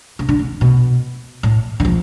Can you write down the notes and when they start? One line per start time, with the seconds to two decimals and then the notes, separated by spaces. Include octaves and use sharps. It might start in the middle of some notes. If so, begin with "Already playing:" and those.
0.19 C#3
0.29 D3
0.39 C#3
0.61 B2
1.43 A2
1.80 D3
1.85 F3